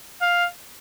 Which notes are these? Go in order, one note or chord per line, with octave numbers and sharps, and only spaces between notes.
F5